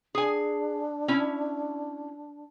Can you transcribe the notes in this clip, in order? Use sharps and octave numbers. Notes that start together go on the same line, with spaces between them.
D4 G#4 G#5
C#4 E4